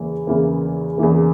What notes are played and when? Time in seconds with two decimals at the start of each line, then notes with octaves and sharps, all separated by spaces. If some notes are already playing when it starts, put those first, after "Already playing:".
Already playing: E2 C#3 E3 A#3
0.27 E2 C#3 E3 A#3
0.98 E2 C#3 E3 A#3